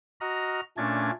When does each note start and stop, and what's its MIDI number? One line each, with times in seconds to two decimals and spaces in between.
0.21 0.61 66
0.21 0.61 75
0.21 0.61 82
0.21 0.61 89
0.77 1.11 46
0.77 1.11 57
0.77 1.11 61
0.77 1.11 62
0.77 1.11 92
0.77 1.11 93